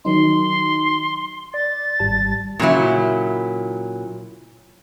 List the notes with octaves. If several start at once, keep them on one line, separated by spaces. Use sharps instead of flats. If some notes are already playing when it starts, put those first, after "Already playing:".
D#3 F#3 D#4 C6
D5 A6
G#1 G3 A5
A#2 C#3 F#3 E4